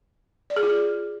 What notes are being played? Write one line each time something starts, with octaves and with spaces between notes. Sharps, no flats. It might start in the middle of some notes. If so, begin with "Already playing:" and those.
D5
G#4
F4